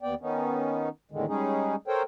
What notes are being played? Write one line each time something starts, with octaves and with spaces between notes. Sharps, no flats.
D#2 B3 D5 G5
D#3 B3 C#4 D#4
E2 A2 D3 D#3 G#3
G3 G#3 C#4 D#4 G#4
A4 A#4 C5 C#5 G5